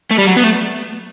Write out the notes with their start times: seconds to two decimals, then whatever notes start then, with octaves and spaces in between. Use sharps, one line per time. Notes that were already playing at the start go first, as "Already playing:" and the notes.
0.11 A3
0.18 G3
0.27 F#3
0.36 B3
0.43 A3